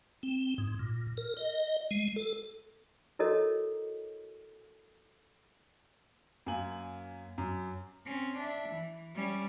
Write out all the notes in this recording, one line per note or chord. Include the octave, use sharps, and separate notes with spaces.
C4
G#2
A#2
A#4
D#5
G#3
A4
E4 F#4 A4 A#4 C#5 D#5
F#2 F#3 A#3 G#5 F#7
F#2
C4 C#4
D4 E5
E3
G3 C#4